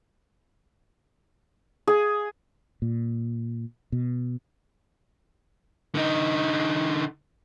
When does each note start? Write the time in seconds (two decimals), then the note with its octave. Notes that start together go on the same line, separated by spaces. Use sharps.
1.87 G#4
2.82 A#2
3.92 B2
5.95 D3 D#4